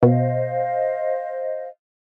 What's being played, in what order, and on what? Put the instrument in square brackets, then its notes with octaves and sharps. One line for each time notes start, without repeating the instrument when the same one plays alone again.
[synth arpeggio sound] B2 [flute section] C5 D#5 F5